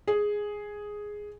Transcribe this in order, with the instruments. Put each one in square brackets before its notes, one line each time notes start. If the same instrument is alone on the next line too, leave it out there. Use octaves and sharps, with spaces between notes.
[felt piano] G#4